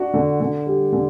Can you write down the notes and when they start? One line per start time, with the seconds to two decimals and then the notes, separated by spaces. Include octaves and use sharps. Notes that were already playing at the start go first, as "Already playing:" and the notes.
Already playing: D4 F#4
0.14 D3
0.40 D3
0.66 G3
0.93 D3